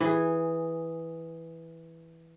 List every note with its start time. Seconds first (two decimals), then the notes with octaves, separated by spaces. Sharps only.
0.01 E3 G#4